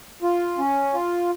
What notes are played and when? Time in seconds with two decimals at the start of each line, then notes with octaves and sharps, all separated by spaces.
0.22 F4
0.58 C#4
0.93 F4